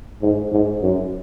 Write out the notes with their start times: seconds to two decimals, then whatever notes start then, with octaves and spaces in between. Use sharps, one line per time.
0.22 G#2
0.52 G#2
0.82 F#2